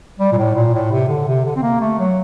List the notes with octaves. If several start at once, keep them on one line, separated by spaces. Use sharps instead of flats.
G3
A#2
A2
A#2
A2
C3
D3
C3
D3
C4
A#3
A3
F#3